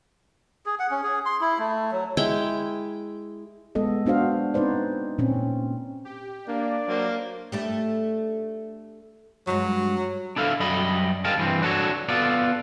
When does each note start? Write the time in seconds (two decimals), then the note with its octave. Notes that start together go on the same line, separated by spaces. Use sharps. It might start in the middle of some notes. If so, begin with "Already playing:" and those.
0.66 G#4
0.79 F#5
0.91 C#4
1.03 G#4
1.26 C6
1.41 E4
1.59 A3
1.92 F#3
2.17 G#3 E4 G5
3.75 G#3 B3 A4 D#5
4.06 B3 D4 F#4 C5 F5
4.54 C4 D#4 B4 C5 D5
5.18 A#2 C4 C#4
6.05 G4
6.48 A#3 D4 D5
6.88 F#3 A#3 C5
7.52 A3 D4 G4
9.47 G2 F#3 G#3
10.36 D4 E4 A4 F5
10.60 F#2 G3 D#5 B5
11.25 G#4 A#4 D#5 F5 G5 A5
11.37 G2 E3 C4
11.62 D4 F#4 A4 B4 C#5
12.09 B3 F4 A4 D5